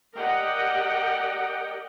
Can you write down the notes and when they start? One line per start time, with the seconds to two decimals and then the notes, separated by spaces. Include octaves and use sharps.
0.16 G4 A#4 D5 D#5 F#5 G5